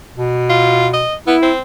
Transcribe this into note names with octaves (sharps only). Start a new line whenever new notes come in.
B2
F4
D#5
B3 E4
C4